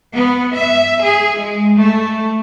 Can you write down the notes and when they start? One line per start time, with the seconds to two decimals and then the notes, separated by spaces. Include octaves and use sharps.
0.11 B3
0.52 E5
1.03 G#4
1.36 G#3
1.76 A3